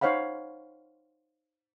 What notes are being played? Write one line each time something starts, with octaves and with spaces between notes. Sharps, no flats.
D#4 C5 C#5 F5 F#5 B5